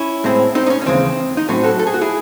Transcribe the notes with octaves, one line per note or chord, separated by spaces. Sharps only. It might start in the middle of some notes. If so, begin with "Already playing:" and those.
Already playing: C#4 E4
A2 G#3 C4
C4 D#4
D#4
C#4
C#4
D#2 C#3 E3 G#3 C4
D#4
A2 F#3 C4 C#4
F#4 A4
A4
G#4
F#4
E4 G#4